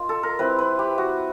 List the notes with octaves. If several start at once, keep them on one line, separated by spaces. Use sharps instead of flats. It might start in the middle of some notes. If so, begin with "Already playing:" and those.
Already playing: A#3 D#4 F4
A4
A#4
G3 C4 E4 B4
B4
G4
F#4